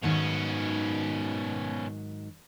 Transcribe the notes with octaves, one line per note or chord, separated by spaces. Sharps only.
G#2 B2 D#3 F#3 C#4